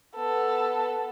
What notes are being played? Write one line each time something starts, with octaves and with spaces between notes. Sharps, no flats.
B3 A4